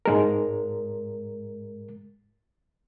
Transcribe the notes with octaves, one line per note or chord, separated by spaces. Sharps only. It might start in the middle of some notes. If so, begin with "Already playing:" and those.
G#2 G#3 A#4